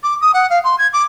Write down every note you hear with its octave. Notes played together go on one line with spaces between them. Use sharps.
D6
D#6
F#5
F5
C6
G#6
D6